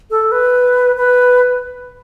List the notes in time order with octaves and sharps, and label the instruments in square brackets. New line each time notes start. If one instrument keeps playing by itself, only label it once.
[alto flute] A4
B4
B4